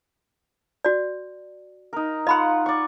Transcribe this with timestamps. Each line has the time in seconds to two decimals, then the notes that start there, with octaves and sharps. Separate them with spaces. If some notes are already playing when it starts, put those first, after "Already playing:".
0.85 F#4 D5
1.93 D#4 A#4
2.27 F4 D#5 F#5 B5 C6
2.66 D5 C#6